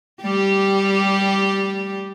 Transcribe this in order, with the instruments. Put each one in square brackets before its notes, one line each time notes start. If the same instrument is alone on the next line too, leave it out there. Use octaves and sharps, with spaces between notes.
[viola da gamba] G3 G4